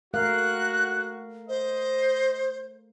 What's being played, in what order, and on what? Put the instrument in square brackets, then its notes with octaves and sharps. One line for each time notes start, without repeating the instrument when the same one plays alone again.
[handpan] A3 A#4 F5 [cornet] F#4 [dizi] F#6
[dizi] C5 [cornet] D#5